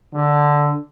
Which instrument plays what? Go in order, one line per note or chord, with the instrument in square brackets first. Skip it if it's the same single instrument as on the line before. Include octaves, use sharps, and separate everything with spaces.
[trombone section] D3